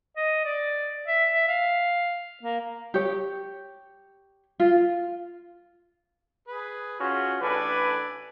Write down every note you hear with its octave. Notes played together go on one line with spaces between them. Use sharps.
D#5
D5
E5
E5
F5
A#3
G4 C#5
F4
G#4 B4
C#4 F4 F#4 G#4
A1 D4 A4 B4 D5 G#5